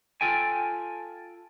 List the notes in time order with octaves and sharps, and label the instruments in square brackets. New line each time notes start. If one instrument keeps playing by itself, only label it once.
[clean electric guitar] F4 A4 G5 G#5